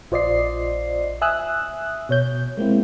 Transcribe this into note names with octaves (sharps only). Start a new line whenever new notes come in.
A#1 F4 C5 D5 D#5 C7
E5 G#5 D#6 E6 F#6
B2 C#5 G6
G#3 A#3 C4 E4